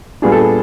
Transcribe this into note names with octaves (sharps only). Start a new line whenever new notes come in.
A#2 G3 B3 D4 G#4
A4
G#4